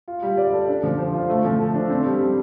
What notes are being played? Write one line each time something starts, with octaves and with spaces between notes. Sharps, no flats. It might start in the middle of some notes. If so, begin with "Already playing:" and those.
F4
G3
D5
A4
D4
F3
C5
F4
A3
F3
A4
D4
C4
G3
G3